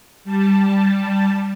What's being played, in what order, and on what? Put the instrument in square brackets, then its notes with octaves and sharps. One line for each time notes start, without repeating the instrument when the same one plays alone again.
[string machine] G3 A5